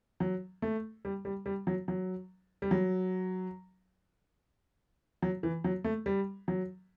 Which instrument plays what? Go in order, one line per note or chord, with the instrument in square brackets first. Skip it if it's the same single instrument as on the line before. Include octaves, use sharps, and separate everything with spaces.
[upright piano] F#3
A3
G3
G3
G3
F#3
F#3
G3
F#3
F#3
E3
F#3
A3
G3
F#3